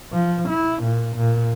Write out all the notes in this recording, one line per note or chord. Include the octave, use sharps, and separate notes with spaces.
F3
E4
A#2
A#2